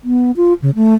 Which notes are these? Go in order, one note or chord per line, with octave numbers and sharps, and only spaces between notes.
B3
F4
C#3
A3